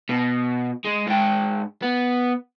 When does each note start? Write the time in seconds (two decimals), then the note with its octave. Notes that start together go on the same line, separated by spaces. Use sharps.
0.09 B2
0.85 G#3
1.06 G#2 G5
1.82 B3